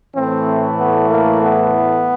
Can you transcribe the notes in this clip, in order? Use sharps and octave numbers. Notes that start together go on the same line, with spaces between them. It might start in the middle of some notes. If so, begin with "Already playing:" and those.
A2 E3 A3 C4
B3
A#3
B3